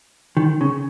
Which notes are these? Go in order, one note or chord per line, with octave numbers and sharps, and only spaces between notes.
D#3
C#3